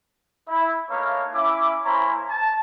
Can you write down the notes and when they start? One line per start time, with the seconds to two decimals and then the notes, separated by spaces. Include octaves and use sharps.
0.48 E4
0.89 A3 A#3 D#4 B4 C#5 F5
1.34 C#4 E4 D6
1.85 A#3 E4 C5 C#5 G#5 A#5
2.29 A5